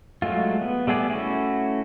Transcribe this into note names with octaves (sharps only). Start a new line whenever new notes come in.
F#3 G#3 A3 F4
B3
G3 A3 B3 G#4 D5
A3 C#4 E4 F#4